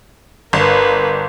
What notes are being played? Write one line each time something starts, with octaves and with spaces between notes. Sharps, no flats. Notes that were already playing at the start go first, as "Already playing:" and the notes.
G1 A#4 B4